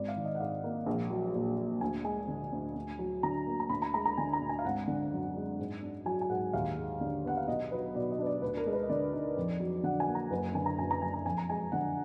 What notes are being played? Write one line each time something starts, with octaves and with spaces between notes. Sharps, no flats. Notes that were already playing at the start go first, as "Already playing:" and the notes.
Already playing: G#1 D5
F5
D#3
D#5
F#5
G#2 F5
A#3
A#1
F#3
A#2
A#3
D2 G#5
G#3 G#5
D3
D2
D2
F#3
D3 A#5
A#3
A#5
D2 B5
A#5
G#3 A#5
A#5
D3 G#5
A#5
D2
G#5
F5
G#1 F#5
D3
F#2
G#3
G#2
D4
F#3 G#5
G#5
G#2 F#5
D#2 F5
G#3
D3
B3 F#5
F5
B1 D#5
F#3 B4
B2 D5
D#5
D4 B4
D5
D2 B4
A#4
G#3
B4
D#5
D3 D5
D#4
F2
F#3
D3 F#5
G#5
A#3
A#5
F#1 B4
D3 G#5
A#5
F#2 G#5
A#5
F#1 G#5
A#5
F2 G#5
A#5
G#3 G#5
D3 F#5